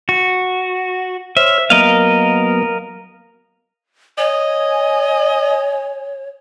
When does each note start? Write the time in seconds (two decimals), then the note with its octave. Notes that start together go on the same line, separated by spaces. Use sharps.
0.09 F#4
1.37 C5 C#5 E5 F6
1.70 F#3 A#3 B3 A#4 D#5 F5
4.18 C#5 D#5 G#5